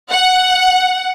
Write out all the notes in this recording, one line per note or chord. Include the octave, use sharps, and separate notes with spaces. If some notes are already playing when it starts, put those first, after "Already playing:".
F#5